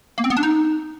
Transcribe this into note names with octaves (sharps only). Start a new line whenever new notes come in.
A#3
C4
B3
D4
D#4